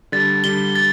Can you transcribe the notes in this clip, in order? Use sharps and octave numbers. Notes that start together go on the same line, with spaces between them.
D3 G3 A6
D3 G3 G7
A6